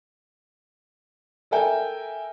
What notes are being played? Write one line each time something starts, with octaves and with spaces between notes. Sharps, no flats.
A4 A#4 E5 G5 G#5